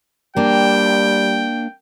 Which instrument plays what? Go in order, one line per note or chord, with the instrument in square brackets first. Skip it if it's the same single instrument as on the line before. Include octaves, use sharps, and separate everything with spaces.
[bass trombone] G3 [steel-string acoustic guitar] A#3 D4 [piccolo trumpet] G5